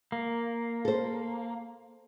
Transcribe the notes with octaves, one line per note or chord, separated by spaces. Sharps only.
A#3
A4 C5